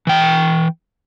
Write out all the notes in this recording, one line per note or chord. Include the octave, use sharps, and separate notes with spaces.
E3 G5